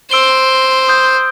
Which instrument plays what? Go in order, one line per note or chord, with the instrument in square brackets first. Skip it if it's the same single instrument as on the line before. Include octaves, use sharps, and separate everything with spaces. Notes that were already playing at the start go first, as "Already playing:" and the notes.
[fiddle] C5 [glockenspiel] E6 D7 G7
[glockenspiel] D#6 G6